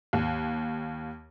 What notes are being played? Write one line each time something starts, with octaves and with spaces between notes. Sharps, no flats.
D#2